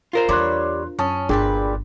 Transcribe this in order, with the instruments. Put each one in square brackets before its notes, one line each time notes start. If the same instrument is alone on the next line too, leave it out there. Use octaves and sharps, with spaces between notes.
[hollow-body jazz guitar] F4 A#4 C5
[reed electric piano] E2 C6 F#6 [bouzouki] G3 C#5 [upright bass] D4
[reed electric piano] F#2 A5 D#6 [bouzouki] C#4
[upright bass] G1 [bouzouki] A#2 G3 B4 [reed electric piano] D4 G#4 G5